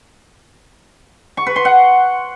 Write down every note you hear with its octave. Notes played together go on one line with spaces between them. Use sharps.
C#6
B4
C6
F#5